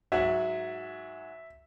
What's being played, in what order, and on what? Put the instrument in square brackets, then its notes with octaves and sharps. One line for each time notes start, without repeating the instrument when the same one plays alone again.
[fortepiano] G#2 F#3 F#4 [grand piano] E5